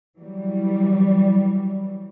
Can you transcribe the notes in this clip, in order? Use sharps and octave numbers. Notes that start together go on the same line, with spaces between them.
E3 F#3 G3